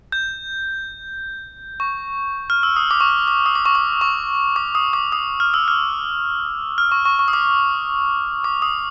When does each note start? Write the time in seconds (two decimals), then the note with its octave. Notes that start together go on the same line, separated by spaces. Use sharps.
0.12 G6
1.80 C#6
2.50 F6
2.63 E6
2.76 D#6
2.91 D6
3.00 C#6
3.08 D6
3.28 D6
3.46 D#6
3.55 D6
3.65 C#6
3.75 D6
4.01 C#6
4.56 D6
4.75 D#6
4.93 D6
5.12 D#6
5.40 F6
5.54 E6
5.68 F6
6.78 F6
6.92 C#6
7.05 C#6
7.19 C#6
7.28 D#6
7.33 D6
8.44 D6
8.62 D#6